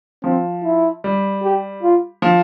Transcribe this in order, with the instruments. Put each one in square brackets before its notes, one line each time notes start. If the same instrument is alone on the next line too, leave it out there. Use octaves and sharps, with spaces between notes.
[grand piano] F3 [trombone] C4
[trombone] E4
[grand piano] G3
[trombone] G4
F4
[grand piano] F3